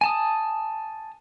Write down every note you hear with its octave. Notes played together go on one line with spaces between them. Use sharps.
G#5 A5 D#6